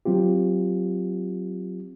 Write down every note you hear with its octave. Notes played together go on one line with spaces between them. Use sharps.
F#3 C4 F4 G4